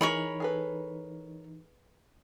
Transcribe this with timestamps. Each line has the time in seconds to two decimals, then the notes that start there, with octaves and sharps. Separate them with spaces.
0.01 E3 D#4 G#4 A#4 C#5 B5
0.40 G#4 A4 B4